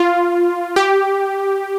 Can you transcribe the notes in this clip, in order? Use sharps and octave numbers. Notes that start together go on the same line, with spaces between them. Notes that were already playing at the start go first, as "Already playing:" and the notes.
Already playing: F4
G4